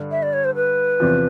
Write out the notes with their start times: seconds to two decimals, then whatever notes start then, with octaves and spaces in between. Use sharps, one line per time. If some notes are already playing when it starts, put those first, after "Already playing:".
Already playing: G2 D3
0.11 E5
0.23 D5
0.33 C#5
0.45 C5
0.55 B4
1.00 E2 C3 F3